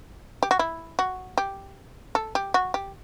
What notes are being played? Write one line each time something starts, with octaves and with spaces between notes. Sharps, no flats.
G4
F#4
E4
F#4
G4
A4
G4
F#4
G4